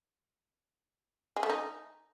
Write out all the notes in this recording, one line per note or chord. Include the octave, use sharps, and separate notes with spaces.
G#3
A3
D#4